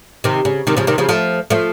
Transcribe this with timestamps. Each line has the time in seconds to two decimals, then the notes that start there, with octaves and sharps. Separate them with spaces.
0.24 C3 D#3
0.45 C#3
0.67 C3 D#3
0.77 C#3 F3
0.87 C3 D#3
0.98 C#3 F3
1.09 F3 A3
1.50 F3 A3